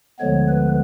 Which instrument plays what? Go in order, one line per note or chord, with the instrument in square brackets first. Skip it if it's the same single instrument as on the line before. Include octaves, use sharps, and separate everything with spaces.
[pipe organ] D2 D3 F3 G#3 B3 C#5
B4